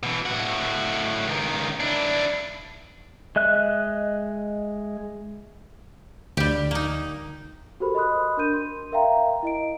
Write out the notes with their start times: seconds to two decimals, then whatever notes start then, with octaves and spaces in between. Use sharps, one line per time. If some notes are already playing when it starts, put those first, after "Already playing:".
0.03 B2 E3
0.26 A2 F#4
1.27 C#2 D#3
1.80 D4 E4
3.36 G#3 D#5 E5 F#6
6.37 D2 G3 G4
6.71 A#3 D#4
7.80 F#4 G4 A4 A#4 C5 B5
7.95 D#5 B5 C6 D#6 F#6
8.37 D4 A#4 G6 D#7
8.54 C6
8.92 A#4 E5 F5 G5 A#5
9.43 E4 D#5 D7